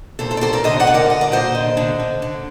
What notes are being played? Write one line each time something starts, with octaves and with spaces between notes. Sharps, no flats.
A#2 A4 C5
A4 C5
D5
A#2 A4 C5
A#4 D5
D3 C5 D#5
D5 F#5
D3
A#4 D5
A#2 D#5
D5
A#2 C5 D#5
D3
D3
D3
D3